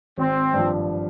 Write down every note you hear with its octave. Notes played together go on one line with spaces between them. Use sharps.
G#1 C4
G2 F3